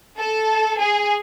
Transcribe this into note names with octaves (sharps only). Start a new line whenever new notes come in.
A4
G#4